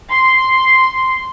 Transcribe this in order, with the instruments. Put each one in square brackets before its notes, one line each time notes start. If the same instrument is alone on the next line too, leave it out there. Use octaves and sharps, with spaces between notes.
[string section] C6